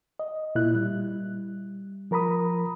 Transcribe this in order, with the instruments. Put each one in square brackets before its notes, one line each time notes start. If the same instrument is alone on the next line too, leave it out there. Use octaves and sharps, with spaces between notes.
[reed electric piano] D#5
A#2 E4 F#6
G3
F3 A#4 A#5 B5 D#6